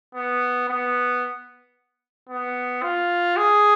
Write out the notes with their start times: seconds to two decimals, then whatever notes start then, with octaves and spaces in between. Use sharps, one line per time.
0.15 B3
0.69 B3
2.29 B3
2.83 F4
3.37 G#4